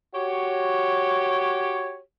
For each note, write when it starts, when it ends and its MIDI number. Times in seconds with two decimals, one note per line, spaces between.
0.15 2.00 66
0.15 2.00 67
0.15 2.00 73